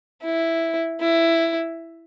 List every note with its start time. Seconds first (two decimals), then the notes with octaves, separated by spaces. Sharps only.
0.22 E4
1.00 E4